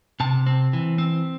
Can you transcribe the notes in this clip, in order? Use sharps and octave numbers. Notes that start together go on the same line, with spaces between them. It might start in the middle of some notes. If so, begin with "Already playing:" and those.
C3 A5
C4
E3
C4